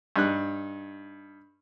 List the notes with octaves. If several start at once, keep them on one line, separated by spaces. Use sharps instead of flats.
G2 D#4 F#6